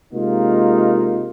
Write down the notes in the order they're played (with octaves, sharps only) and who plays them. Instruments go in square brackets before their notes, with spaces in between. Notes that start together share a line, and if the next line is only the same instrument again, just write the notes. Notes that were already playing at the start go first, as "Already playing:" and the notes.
[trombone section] C3 G#3 A#3 D#4 F4